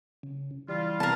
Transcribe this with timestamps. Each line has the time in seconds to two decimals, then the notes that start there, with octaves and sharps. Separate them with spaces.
0.23 C#3
0.69 E3 G3 F4
1.00 C3 E3 B3 A#4 A5